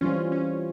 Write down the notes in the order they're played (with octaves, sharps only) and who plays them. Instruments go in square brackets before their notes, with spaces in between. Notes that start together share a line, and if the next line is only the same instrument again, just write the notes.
[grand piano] E3 G3 C4 [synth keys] C#4 F4
[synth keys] C#4